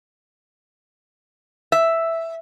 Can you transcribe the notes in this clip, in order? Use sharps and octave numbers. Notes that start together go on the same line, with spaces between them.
E5